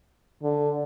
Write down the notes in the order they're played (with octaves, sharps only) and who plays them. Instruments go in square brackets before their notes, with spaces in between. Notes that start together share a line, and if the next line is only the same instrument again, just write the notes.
[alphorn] D3